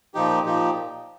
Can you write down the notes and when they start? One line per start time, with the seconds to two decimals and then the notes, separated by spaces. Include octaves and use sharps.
0.14 A#2 F3 D#4 G4
0.45 A#2 F3 D#4 G4